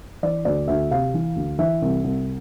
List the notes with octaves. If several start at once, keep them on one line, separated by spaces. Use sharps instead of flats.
E3 D5
D2 D5
D2 E5
C3 F5
E3
D2
E3 E5
C2
C2